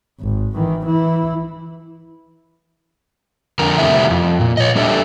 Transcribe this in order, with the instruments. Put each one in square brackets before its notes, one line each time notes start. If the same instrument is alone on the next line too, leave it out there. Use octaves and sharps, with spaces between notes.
[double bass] G#1
D#3 E3
E3 E4
[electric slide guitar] F2 D3 A#4
C3 D#3 G3 A3 D#4 E4
F2
A#2
C#5 D#5
G3 D4 G4 A4 E5